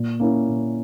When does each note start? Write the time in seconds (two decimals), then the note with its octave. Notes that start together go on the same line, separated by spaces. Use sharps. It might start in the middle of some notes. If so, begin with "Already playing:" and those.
Already playing: A#2
0.20 A#3 C#4 E4
0.48 A#2